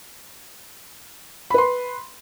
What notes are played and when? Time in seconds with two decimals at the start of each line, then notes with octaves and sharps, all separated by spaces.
1.50 B5
1.54 B4
1.58 C6